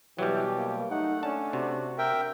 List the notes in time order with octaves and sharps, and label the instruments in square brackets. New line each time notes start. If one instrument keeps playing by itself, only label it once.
[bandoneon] B2 [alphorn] E3 [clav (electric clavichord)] F#3 G3 [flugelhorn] G4
[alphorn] A#3
[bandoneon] A3 [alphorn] D#4 [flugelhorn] F#5
[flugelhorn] C#4 [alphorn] D4 [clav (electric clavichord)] A5
[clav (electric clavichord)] C3 [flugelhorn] F#4
[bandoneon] A#4 E5 G5